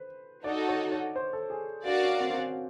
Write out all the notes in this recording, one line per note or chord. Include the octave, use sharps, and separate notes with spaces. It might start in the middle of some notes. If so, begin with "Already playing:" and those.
Already playing: B4 C5
D#4 F#4 A4 D5
C#5
C#5
C5
A4
G#4
D4 F#4 A#4 D5 F5
C#4
C4
C4
C#4